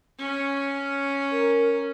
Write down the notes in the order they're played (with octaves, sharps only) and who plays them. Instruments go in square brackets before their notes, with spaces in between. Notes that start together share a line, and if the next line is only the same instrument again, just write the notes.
[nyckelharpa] C#4
[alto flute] A#4